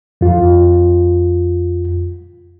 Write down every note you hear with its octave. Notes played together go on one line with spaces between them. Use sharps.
F2 F4